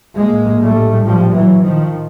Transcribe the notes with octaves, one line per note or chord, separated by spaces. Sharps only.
A#1 A2 G#3 A#3
G3 A3
F3 G3
E3 F#3
D#3 F3